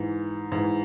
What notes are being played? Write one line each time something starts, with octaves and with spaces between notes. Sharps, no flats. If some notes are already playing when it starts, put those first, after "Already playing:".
Already playing: G#2 E3
G#2 E3